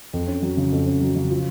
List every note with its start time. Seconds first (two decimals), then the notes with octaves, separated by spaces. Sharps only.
0.13 F2
0.27 C#4
0.42 F#3
0.57 C#3
0.72 F2
0.86 C#4
1.01 F#3
1.16 C#3
1.30 F3